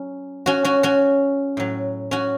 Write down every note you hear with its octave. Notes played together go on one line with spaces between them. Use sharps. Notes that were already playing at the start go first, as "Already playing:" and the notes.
Already playing: F#3 C#4
C#4 F#4
C#4 F#4
C#4 F#4
A2 F#3
C#4 F#4